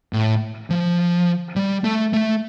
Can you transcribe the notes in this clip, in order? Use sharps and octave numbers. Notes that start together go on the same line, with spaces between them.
A2
F3
G3
A3
A3